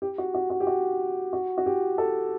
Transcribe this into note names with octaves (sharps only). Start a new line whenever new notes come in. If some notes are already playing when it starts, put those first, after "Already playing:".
G4
F#4
F#4
F#4
G4
F#4
F#4
F#4
G4
A4